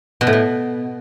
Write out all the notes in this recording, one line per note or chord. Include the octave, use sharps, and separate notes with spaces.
B2
A2
B2